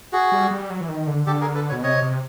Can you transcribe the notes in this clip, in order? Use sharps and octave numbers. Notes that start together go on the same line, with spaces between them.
F#4 G#4
G3
G3
F#3
E3
D#3
D3
D3 G4 A4
G#4 A#4
A4 B4
B4 C#5
B2
C3 C#5 D#5
C3